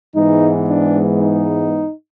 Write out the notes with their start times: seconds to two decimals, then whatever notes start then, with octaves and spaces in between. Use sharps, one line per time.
0.15 G#2 E3 G#3 B3 D#4
0.69 D4
1.21 D#4